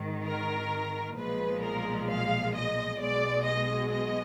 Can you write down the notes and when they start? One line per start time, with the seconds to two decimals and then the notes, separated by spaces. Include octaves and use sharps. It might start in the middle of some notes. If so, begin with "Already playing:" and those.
Already playing: G#1 G#2 D#3
0.25 A#4
1.16 B1 A#2 F3 G#3 B4
1.63 A#4
2.08 F5
2.54 D#5
2.99 B1 B2 G#3 D5
3.46 D#5
3.91 D#5